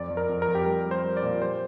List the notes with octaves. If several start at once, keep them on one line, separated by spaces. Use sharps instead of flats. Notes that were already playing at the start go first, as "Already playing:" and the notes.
Already playing: F2 D5
F2
A#4
F2
A#4
F2
G4
G3 A#4
G3
C5
G3
D5
A#2
G3 C5